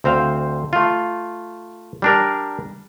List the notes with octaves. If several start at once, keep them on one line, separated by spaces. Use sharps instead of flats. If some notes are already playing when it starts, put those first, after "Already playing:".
D2 C4 C5 F5
A3 F4
G3 D4 A#4